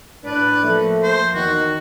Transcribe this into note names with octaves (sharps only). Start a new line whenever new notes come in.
A2 D4 B4 D5
F3 A3 A#3
C5
E2 D#3 F#4